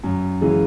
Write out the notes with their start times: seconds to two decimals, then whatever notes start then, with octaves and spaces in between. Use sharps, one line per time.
0.04 F#2
0.41 C#3 E3 G#3